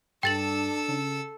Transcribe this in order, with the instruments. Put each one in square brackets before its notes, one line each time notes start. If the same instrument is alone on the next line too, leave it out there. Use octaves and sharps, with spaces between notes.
[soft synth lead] G2 [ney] D4 [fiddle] A4 E6 [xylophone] G5 A6 F#7
[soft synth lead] C#3